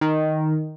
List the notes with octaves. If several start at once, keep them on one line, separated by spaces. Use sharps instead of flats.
D#3